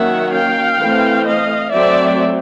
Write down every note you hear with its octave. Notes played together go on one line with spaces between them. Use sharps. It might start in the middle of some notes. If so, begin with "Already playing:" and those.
Already playing: D#3 F#3 A#3 C#4 E5 F#5
F5 G5
E3 A3 C4
D#5 F5
F#3 A3 C4 D5 E5